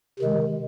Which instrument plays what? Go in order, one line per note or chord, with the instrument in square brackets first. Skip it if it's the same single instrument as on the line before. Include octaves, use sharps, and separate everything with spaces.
[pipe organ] C3 D#3 G#3